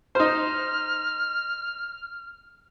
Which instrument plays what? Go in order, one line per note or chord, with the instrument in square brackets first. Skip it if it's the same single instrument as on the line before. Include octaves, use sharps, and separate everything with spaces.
[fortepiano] D#4 C5 [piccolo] F6